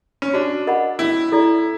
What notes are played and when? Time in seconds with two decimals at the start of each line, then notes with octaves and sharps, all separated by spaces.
0.22 C#4
0.34 D4 F#4
0.67 A#4 D#5 F#5 B5
0.99 C#4 E4
1.32 E4 A4 D5